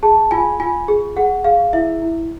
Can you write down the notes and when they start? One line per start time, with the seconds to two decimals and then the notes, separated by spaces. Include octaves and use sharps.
0.03 G#4 A5
0.31 F4 G#5
0.60 F4 G#5
0.88 G#4
1.17 G#4 F#5
1.44 G#4 F5
1.73 E4 E5
2.02 E4